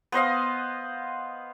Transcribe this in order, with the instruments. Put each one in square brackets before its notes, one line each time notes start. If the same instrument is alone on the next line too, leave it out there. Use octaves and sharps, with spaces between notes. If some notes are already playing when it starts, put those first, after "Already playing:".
[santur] B3 C5 D#5 F5